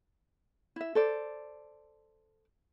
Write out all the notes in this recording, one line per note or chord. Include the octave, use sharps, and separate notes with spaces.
E4 E5
A4 C5 D5